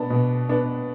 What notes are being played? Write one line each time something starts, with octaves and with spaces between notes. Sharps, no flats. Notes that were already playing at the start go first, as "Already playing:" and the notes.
Already playing: B2 B3 D4 A5
B2
B3 D4